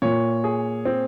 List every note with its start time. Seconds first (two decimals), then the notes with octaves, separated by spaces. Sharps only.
0.02 A#2 C#5
0.44 G#4
0.85 C4